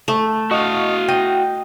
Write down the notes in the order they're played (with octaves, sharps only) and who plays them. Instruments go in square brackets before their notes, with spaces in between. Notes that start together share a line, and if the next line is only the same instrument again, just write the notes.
[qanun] A3
[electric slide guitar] F#4 F5 [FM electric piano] D#5 C#6 D#6
[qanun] D#5 [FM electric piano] G5